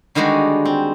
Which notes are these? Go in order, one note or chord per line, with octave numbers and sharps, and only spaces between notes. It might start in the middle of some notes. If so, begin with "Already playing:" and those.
D3 D#3 G3 G#3 F#4
C4